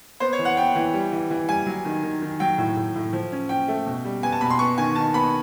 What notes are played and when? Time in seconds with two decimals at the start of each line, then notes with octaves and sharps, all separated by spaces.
0.20 B3 C5
0.33 C#5
0.39 E3
0.45 F#5
0.57 B3 G5
0.75 E3
0.93 G3
1.12 E3
1.30 E3
1.49 G3 G#5
1.66 F#3
1.85 D#3
2.03 D#3
2.22 D#3
2.40 F#3 G5
2.58 A2
2.77 A2
2.95 A2
3.13 F3
3.32 C#4
3.49 C#4 G5
3.68 A3
3.86 B2
4.05 G3
4.23 B3 G#5
4.32 A5
4.41 B2 B5
4.50 C6
4.59 B3 C#6
4.78 D#3 G#5
4.96 D#3 A5
5.14 B3 B5